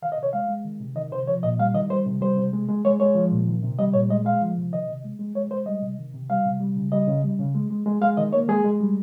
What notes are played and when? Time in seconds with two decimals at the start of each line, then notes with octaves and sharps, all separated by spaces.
0.02 D#3 F5
0.12 D#5
0.18 C3
0.23 C#5
0.33 G#3 F5
0.49 G#3
0.64 D#3
0.80 C3
0.96 D#3 D#5
1.11 C3 C5
1.27 F3 C#5
1.43 A#2 D#5
1.59 G3 F5
1.74 D#3 D#5
1.90 G3 C5
2.06 C3
2.21 G3 C5
2.37 C3
2.53 G#3
2.69 G#3
2.85 G#3 C#5
3.00 G#3 C#5
3.15 F3
3.31 A#2
3.47 D#3
3.63 C3
3.79 G3 D#5
3.93 A#2 C#5
4.09 G#3 D#5
4.25 G#3 F5
4.41 F3
4.57 C3
4.72 D#3 D#5
4.89 C3
5.04 G#3
5.19 G#3
5.35 G#3 C#5
5.51 G#3 C5
5.66 G3 D#5
5.82 C3
5.98 D#3
6.13 C3
6.30 G3 F5
6.45 C3
6.60 G3
6.76 C#3
6.92 G3 D#5
7.07 C#3
7.24 G3
7.39 C#3
7.55 G#3
7.70 G#3
7.86 G#3
8.01 G#3 F5
8.17 D#3 D#5
8.33 A#3 C#5
8.48 G#3 G#4
8.64 G#3
8.80 G3